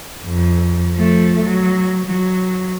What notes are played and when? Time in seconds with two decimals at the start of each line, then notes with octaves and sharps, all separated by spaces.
0.26 F2
0.95 F3 A3
1.43 F#3
2.05 F#3